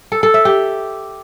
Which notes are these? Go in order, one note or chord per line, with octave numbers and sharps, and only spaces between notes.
A4
A4
E5
G4